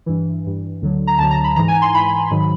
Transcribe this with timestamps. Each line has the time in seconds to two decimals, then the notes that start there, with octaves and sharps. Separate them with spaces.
0.06 G2 E3
0.45 G2 E3
0.82 D2 D3 F#3
1.07 A#5
1.18 D2 D3 F#3 A5
1.31 A#5
1.44 B5
1.56 G#2 E3 A#5
1.68 G#5
1.82 C6
1.94 G#2 E3 B5
2.31 G#2 D#3 F#3